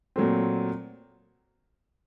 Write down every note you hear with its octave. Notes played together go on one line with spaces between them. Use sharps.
A#2 F#3 A3 C4